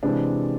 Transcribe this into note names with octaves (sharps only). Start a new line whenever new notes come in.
C3 E3 G#3 C4 D4